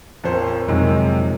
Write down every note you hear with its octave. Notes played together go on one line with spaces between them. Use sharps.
A#1 F2 C5 C#5
F2 C3 D#3 F#3 G#3